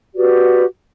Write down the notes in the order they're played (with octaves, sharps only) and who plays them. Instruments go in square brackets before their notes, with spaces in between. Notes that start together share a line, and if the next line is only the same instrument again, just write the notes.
[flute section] F#4 G4 B4 D5